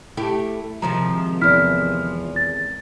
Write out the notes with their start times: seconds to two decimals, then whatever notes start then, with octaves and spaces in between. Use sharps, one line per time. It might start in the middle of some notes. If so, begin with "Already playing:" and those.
0.17 A3 E4 G4
0.82 C3 D#3 F3 G#3 A#5
1.41 E2 E4 F6 B6
2.36 A6